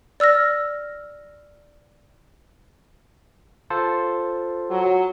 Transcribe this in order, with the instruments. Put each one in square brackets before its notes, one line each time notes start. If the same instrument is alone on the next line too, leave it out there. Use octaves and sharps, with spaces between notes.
[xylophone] D5 E6 F6 A#6
[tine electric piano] F4 A4 C5
[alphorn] F#3